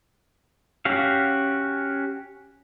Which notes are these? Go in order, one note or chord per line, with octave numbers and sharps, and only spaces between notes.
C#4 F#4 G4 F5